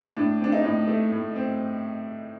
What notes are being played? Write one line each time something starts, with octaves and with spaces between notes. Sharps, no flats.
A2 D4
C4 D4
D#4
A2
A3
A2
C4